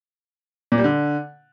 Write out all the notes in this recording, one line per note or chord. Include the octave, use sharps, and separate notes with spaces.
A#2
G3
D3